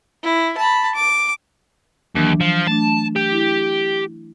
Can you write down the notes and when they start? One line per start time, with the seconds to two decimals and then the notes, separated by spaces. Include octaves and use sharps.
0.23 E4
0.57 A5 B5
0.95 D6
2.15 D#2 E3 F#3 D4
2.40 F3
2.67 A3 D4 A5
3.16 G4
3.32 E4